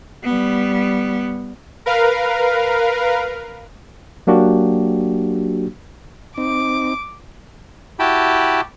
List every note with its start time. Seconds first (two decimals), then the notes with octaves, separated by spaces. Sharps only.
0.24 G3 B3
1.86 A#4 B4 F5
4.27 F#3 A#3 D4 F#4 G4
6.38 C4 D#4 D6
7.99 E4 F#4 G4 G5 A5 B5